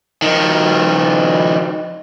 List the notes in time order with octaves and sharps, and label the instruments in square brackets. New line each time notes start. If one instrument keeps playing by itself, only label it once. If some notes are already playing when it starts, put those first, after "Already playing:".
[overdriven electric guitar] D#3 F3